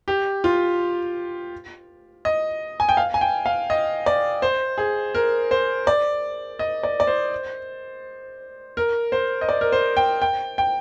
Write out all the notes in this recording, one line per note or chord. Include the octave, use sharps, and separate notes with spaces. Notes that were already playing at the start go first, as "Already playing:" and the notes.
G4
F4
D#5
G#5
G5
F5
G#5
G5
F5
D#5
D5
C5
G#4
A#4
C5
D5
D#5
D5
D5
C5
A#4
C5
D#5
D5
A#4
C5
G5
G5
G5